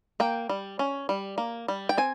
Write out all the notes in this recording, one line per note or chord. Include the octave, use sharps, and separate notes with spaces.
A#3 G5
G3
C#4
G3
A#3
G3
G5
C4 G#5